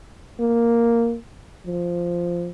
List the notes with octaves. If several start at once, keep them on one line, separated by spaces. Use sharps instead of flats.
A#3
F3